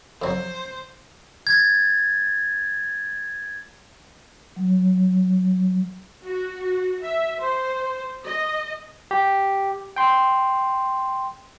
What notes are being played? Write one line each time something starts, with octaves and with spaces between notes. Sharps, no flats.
F2 F#3 C5
G#6 A6
F#3
F#4
E5
C5
D#5
G4
G5 C6